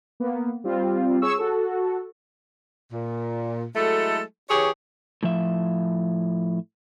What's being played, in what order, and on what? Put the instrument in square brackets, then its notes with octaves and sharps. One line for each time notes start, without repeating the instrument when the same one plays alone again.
[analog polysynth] A#3 B3
G3 C4 F4
G#4 C#5 C#6 E6
F#4 A4
[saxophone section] A#2
F#3 G#3 A3 E4 A4
E3 G4 G#4 C#5
[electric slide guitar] A2 F3 E5